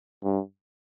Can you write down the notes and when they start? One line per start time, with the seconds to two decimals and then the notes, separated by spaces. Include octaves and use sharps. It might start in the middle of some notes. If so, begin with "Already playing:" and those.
0.24 G2